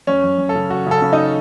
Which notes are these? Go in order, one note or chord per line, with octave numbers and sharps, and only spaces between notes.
F#2 C#4 C#5
F#2
F#2
A4
C#3
C#3 F#4
C#3 A4
C#3
D#4 D#5